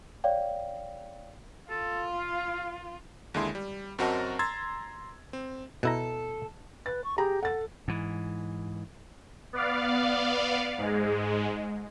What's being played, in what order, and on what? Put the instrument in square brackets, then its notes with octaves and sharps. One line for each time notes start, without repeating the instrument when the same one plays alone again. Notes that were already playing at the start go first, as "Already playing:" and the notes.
[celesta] C#5 D5 F5 G5
[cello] F4 [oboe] A4
[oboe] F5
[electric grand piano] D#2 D3 G#3 E4 C6
G3
F#2 C4 F#4 A#4 D#5 A5
A#5 C6 E6 G#6 A6
C4
[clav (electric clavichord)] B2 E4 A#5 [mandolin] A4
[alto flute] B4 [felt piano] A6
[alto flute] C#6
[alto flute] G4 [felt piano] G#4 A#5
[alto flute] A4 [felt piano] F#5 A6
[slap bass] G#2 E3
[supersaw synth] B3 D5 F5
G#2 G#3